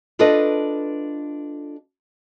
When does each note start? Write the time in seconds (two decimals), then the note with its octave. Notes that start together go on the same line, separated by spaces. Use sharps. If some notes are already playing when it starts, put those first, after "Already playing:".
0.19 D4 F4 A4 B4 D#5